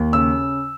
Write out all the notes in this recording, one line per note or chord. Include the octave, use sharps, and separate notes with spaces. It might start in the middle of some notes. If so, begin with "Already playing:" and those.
Already playing: D#2
C#3 E6